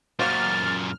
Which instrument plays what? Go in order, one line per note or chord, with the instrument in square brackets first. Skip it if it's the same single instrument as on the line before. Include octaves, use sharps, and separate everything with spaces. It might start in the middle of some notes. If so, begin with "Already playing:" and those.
[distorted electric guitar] F#2 A#2 [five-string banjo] A#3 F#4 C5 [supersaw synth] F6 [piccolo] A6